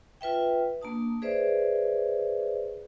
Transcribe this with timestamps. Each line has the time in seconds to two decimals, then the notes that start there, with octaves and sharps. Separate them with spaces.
0.21 F4 B4 E5 G5
0.81 A#3 D4 A5 D#6
1.22 G#4 B4 C5 D5 E5